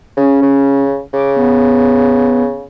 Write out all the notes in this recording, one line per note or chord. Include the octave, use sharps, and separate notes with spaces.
C#3 C#4
C#3
C#3 D6
B3